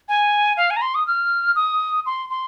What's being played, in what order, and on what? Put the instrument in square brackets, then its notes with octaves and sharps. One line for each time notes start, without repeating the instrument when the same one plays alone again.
[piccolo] G#5
F5
G#5
A#5
C6
D#6
F6
D#6
C6
C6